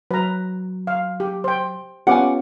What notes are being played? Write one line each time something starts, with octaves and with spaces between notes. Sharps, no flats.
F#3 B4 A#5
F5
G4
C5 G5
B3 C#4 F4 G4 F#5 G#5 D6